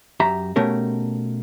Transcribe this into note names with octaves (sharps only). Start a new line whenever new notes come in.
F#2 G4 E5 A#5
B2 A3 C#4 G4 A#4